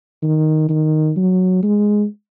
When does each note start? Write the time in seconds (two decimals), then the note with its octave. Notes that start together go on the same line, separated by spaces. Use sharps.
0.23 D#3
0.69 D#3
1.17 F#3
1.63 G#3